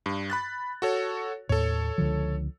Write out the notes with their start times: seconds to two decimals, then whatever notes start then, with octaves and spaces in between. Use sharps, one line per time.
0.06 G2
0.30 B5 F#6 A6
0.82 F#4 A4 C#5
1.49 D#2 A2 A4 C#5
1.98 C#2 D3 F3